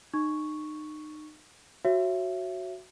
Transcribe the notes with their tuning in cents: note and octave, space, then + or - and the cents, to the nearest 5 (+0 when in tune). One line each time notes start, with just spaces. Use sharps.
D#4 -30 C#6 +0
F#4 +0 C#5 -20 E5 +25